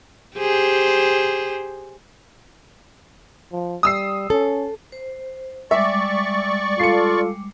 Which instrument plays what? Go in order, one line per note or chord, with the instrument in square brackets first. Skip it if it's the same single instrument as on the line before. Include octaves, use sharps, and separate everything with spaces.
[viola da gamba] G4 G#4 C5
[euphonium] F3
[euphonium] G3 [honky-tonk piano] D#6 E6 C7
[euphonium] C#4 [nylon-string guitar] A4
[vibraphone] C5
[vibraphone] G3 G#3 D6 [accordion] D5 C#6 [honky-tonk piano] E5
[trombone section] F4 A4 [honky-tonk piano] C7 C#7